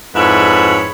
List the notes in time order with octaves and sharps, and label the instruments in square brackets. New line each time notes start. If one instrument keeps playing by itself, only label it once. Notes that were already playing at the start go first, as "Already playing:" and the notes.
[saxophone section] F2 G#2 E4 B4 C#5 E5